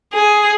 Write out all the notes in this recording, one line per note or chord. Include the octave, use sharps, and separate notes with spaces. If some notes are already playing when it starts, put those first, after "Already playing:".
G#4